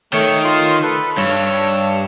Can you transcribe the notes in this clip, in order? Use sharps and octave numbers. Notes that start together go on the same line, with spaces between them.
D#3 A3 C#5 C#6
F4 C6 D#6
A4 B4
G2 C#5 E6